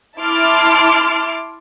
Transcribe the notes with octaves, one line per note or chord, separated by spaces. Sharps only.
E4 A5 C6 D6 F6